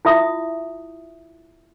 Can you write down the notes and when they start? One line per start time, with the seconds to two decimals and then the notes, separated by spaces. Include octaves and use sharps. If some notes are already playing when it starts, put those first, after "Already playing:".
0.05 E4 F4 E5 D#6